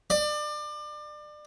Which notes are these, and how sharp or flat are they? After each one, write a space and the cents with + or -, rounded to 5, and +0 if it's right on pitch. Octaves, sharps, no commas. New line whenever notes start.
D5 +30